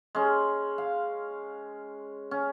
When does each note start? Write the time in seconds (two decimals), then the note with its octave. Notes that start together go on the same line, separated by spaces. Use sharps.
0.15 G#3 C#4
0.78 F5
2.31 C#4